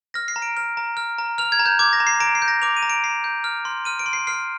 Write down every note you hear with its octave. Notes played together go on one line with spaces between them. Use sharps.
F6 A#6
C7
A#5
D7
F6
A#5
F6
A#5
F6 F7
G#6
A#5
G6
D6 G#6
A#6
A#5
C7
A#5 D7
C7
G6
A#6
D6 F7
D#7
A#5
D7
A#5 C7
G6
F6
C6
F6 D#7
D7
C6
C7
F6 C7